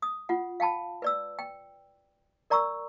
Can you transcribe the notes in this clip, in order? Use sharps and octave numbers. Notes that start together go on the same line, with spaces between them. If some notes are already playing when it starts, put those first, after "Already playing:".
D#6
F4 F#5
F5 G5 A5 B5
B4 D5 E6
G5
A#4 D5 A#5 C#6 E6